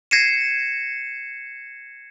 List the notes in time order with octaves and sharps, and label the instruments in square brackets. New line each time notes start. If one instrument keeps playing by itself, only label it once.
[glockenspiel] G#6 A#6 C7 C#7 D#7 E7